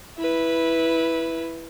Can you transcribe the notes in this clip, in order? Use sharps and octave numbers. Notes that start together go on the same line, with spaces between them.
E4 B4